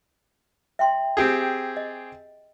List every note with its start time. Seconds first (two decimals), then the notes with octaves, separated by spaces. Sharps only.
0.79 E5 G5 C6
1.17 C4 G4 G#4
1.77 D#5